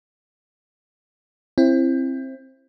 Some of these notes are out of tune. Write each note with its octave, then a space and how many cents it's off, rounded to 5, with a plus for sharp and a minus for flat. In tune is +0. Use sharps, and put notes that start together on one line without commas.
C4 +20 E4 +20